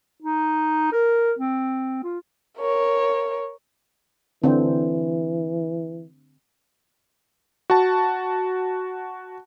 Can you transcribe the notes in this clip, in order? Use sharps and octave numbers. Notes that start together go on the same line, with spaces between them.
D#4
A#4
C4
F4
A#4 C#5
D3 E3 C4
F#4 A5